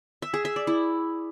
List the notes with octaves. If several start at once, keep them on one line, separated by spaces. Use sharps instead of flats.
E5
G#4
E5
D5
E4